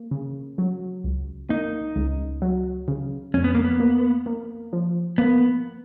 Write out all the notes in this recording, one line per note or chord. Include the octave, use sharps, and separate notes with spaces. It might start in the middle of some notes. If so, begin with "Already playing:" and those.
Already playing: A#3
C#3
F#3
C#2
A#3 D#4
C#2
F#3
C#3
F2 C#4
B3
A#3
B3
A#3
A#3
F3
A#3 B3